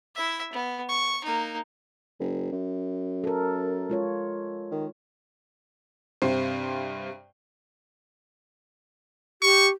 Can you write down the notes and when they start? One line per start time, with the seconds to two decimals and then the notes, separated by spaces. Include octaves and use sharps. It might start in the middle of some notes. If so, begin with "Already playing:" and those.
0.15 E4 E5
0.53 B3
0.89 C#6
1.24 A#3 D#4
2.20 F#1
2.52 F#2
3.24 A4 A#4
3.89 G#3 F4 C#5
4.72 D#3
6.22 G2 C3 C5
9.42 G4 C#6